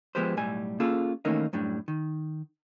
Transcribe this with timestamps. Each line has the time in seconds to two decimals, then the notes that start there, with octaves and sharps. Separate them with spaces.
0.15 F3 G#3 B3 G4 B4 C5
0.37 B1 A2 G3 G#5
0.80 A#3 C#4 F4 G#4 A4
1.25 D#3 E3 A3 A#3 C#4 D#4
1.53 F#2 A2 G3 D4
1.88 D#3